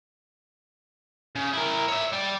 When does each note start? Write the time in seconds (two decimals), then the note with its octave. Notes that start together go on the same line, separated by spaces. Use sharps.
1.35 C#3
1.53 E4 A#4
1.88 C#5 E5
2.13 G3 D5